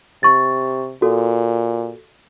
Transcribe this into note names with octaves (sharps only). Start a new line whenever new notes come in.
C3 C#6 A6
A#2 F#4 A4